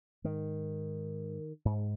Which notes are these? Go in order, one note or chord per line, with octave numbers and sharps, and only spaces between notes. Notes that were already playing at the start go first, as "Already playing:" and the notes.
G#2 D#3
G#2